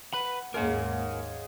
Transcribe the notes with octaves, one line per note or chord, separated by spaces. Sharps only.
B4 F#5 B5
D#2 G#2 C#3 G#3 A#3 G#4 A#4 F#5